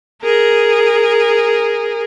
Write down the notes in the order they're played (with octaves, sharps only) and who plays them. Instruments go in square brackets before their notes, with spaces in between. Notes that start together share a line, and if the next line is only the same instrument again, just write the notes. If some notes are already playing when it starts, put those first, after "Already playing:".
[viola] G#4 A#4